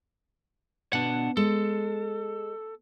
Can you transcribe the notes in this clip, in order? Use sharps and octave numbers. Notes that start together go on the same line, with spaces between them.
B2 D4 F#5
G#3 A4